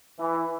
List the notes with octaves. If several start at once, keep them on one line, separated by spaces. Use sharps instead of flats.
E3